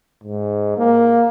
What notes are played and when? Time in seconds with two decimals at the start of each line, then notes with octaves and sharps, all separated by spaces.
0.23 G#2
0.78 A#3